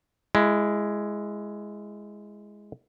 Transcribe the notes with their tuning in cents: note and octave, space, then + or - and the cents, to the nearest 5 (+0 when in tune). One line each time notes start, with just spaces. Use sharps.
G#3 +0 E4 +20